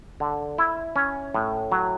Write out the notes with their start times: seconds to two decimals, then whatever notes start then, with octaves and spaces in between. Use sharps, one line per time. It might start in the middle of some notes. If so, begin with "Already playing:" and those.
0.20 D3
0.58 E4
0.96 C#4
1.34 A2
1.72 F#3